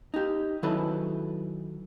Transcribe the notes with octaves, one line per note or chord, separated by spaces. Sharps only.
D#4 G4
D#3 F#3 E4 A4 B4